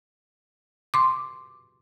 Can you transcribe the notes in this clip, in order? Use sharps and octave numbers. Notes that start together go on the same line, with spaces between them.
C6 D6